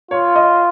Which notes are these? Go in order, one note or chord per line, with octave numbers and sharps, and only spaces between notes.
F4 C#5
D#5